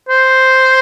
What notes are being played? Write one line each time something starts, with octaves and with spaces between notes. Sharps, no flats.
C5